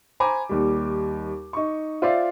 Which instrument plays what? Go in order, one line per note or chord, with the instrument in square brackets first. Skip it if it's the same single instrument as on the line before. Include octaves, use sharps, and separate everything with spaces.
[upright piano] C5 G#5 A#5 B5 D6
D#2 G3
D#4 C#6
F4 C5 D5 E5 F5